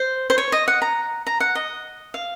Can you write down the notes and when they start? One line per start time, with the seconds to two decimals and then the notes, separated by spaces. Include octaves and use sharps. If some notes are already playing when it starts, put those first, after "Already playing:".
Already playing: C5
0.30 C5
0.38 C#5
0.52 D#5
0.68 F#5
0.82 A#5
1.27 A#5
1.40 F#5
1.55 D#5
2.14 F5